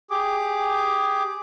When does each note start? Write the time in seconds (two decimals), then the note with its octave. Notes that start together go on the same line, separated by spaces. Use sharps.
0.10 G4 G#4 D6